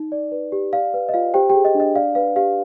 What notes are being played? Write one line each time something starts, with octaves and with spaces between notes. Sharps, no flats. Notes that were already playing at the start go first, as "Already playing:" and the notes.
Already playing: D#4
D5
B4
G4
D5 F5
B4
D#5
F4 F5
G4 C5 G5
G4 G#4 G5
D#5
D4 D#5
D5 F5
B4 F5
G4 F5